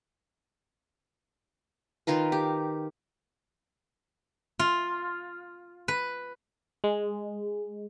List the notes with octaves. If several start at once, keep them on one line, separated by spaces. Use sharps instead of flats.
D#3 F4 A#4 B4
G4
F4
B4
G#3